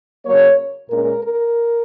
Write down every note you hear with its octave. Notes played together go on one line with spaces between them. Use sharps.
C#3 F#3 A#3 C#5
A#2 G#3 C#4 A#4
A#4